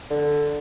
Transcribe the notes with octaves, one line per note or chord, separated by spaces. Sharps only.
D3